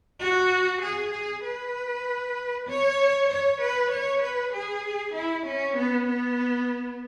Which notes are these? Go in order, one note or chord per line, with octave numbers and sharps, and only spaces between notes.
F#4
G#4
G#4
B4
C#5
C#5
B4
C#5
B4
G#4
E4
C#4
B3
B3